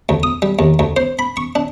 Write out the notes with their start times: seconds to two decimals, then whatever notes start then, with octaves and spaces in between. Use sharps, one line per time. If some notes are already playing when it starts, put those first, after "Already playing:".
0.09 D2
0.23 D#6
0.42 G3
0.59 D#2
0.79 D2
0.97 C5
1.19 B5
1.37 C#6
1.55 D4